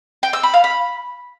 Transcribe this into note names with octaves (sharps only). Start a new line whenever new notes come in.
G5
E6
B5
F5
B5